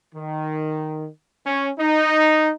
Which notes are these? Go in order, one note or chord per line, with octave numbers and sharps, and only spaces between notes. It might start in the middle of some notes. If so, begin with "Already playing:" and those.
D#3
C#4
D#4